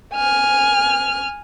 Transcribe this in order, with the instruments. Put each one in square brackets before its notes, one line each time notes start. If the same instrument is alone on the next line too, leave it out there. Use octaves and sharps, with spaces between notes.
[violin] G#5 F6